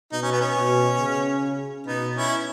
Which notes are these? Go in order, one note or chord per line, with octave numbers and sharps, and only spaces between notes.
B2 D#4
C#4
B3
C#4
B2
C#3
B2 B3 D#4
C#4 E4